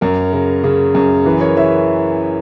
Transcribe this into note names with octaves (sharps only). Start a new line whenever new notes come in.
F#2 A#4
C#3 A#4
C#3
F#2
E3 G#4 B4
A#4 C#5
E3 C#5 E5